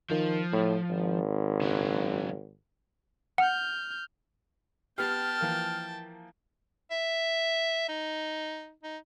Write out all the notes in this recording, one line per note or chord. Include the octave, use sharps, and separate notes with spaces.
D#3 F3
A2
G#1
C#3 F#3
F#5 F6 G6
B3 G4 G5 A5 F6
E3 F3 A#3
E5
D#4
D#4